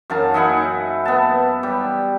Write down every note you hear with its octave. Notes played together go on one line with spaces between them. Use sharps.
F#2 F5 A5 A#5
D#4 E4 F#5 G#5
B3 A5
G3